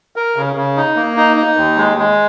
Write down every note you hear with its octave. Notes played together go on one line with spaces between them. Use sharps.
A#4
C#3
C#3
D#4
A#3
D#4
D#4
D#2
G#3
G#3